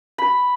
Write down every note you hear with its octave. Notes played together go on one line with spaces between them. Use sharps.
B5